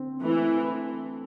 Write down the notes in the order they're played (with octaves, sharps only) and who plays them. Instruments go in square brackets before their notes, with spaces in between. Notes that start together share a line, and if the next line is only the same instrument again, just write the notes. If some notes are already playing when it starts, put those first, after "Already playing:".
Already playing: [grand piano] D3 C4
[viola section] E3 [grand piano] A3